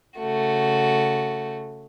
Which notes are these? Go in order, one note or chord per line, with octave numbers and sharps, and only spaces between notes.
C#3 A3 F#4